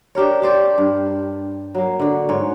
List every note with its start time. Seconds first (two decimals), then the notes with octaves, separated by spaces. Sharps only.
0.15 D4 G4 A#4 C#5
0.42 G4 C5 D5
0.78 G2
1.75 F#3 A#3
2.00 D3 F#4
2.29 G#2 C#5